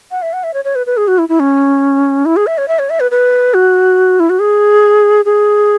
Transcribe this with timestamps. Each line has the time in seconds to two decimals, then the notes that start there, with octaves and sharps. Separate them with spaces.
0.11 F#5
0.22 E5
0.33 F#5
0.43 E5
0.54 C#5
0.65 C#5
0.75 B4
0.86 B4
0.97 G#4
1.08 F#4
1.18 E4
1.29 E4
1.40 C#4
2.25 E4
2.36 G#4
2.47 E5
2.58 C#5
2.68 E5
2.79 C#5
2.90 E5
3.00 B4
3.11 B4
3.54 F#4
4.20 E4
4.29 F#4
4.39 G#4
5.25 G#4